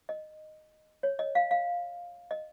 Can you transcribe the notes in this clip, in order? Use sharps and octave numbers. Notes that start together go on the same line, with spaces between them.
D#5
C#5
D#5
F5
F5
D#5